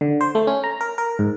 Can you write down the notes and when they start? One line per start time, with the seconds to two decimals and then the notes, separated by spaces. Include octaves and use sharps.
0.01 D3
0.21 C5
0.35 A3
0.47 C#4
0.64 A#5
0.81 A#4
0.98 A#4
1.19 G#2